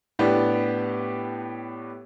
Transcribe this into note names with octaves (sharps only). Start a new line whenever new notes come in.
A2 B3 D4 G4